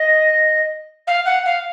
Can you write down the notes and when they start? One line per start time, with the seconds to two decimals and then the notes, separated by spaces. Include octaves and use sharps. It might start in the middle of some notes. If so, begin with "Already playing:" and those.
Already playing: D#5
1.07 F5
1.25 F#5
1.45 F5